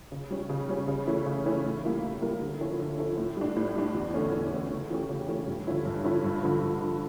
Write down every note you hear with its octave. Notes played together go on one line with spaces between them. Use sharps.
C#3
G3 C#4
C#3
G3 C#4
C#3
E3 A3 C#4 E4
C#3
E3 A3 C#4 E4
A2
G3 A#3 E4 A#4
A2
G3 A#3 E4 A#4
D3
F3 C#4 E4 A4
D3
F3 C#4 E4 A4
A2
G3 D4
A2
G3 D4
E2
D3 A3 C#4
E2
D3 A3 C#4
C#3
E3 A3 C#4 G4
C#3
E3 A3 C#4 G4
G2
D3 F3 C#4 E4
G2
D3 F3 C#4 E4
G2
D3 F3
G2
D3 F3